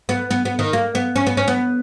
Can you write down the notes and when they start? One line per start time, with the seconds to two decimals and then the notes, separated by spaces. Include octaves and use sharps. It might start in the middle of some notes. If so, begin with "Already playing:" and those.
0.09 B3
0.31 B3
0.45 B3
0.59 D#3
0.73 A#3
0.95 B3
1.16 C#4
1.27 B3
1.37 C#4
1.48 B3